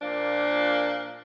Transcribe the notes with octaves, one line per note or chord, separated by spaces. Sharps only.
A#2 F3 A#3 D4